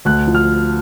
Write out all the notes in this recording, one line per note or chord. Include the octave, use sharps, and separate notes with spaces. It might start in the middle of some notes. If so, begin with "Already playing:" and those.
D2 F#6
F3
F6